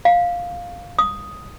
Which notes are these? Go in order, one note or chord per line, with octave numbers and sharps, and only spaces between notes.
F5
D#6